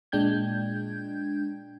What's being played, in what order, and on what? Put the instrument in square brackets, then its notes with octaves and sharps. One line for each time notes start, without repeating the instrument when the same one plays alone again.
[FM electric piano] A#2 G#3 D4 G5 G6 G#6